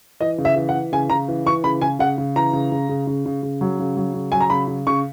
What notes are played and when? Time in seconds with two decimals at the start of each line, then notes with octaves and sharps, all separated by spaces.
0.21 E3 D#5
0.38 C#3
0.45 E5
0.56 E3
0.69 F#5
0.74 E3
0.92 C#3 G#5
1.10 C#3 A#5
1.28 E3
1.46 E3 C#6
1.64 C#3 B5
1.81 C#3 G#5
1.99 C#3 F#5
2.18 C#3
2.36 E3 A#5
2.53 C#3
2.72 C#3
2.89 C#3
3.07 C#3
3.26 C#3
3.43 C#3
3.61 F#3
3.79 C#3
3.97 F#3
4.14 C#3
4.32 F#3 G#5
4.41 A#5
4.50 C#3 B5
4.68 C#3
4.87 C#3 C#6